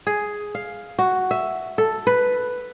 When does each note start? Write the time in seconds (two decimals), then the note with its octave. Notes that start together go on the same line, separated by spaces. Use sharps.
0.07 G#4
0.55 F5
0.99 F#4
1.31 E5
1.78 A4
2.07 B4